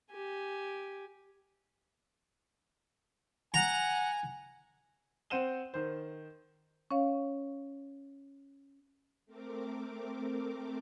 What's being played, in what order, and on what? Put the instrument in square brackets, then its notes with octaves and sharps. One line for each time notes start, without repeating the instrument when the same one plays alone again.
[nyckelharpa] G4 G#5
[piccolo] F#5 [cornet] G#5 [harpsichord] A#5
[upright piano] C4 C5 F#5 D#7 E7 G7
D#3 C5
[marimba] C#4 C#5 F5
[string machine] A3 C4 A#4 D6